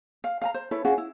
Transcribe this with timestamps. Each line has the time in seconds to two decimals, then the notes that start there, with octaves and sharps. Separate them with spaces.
0.24 F5
0.42 F5 G#5 A#5
0.54 C5
0.71 E4 A4 B4 C#5
0.85 C#4 F4 F#4 G#4
0.98 E4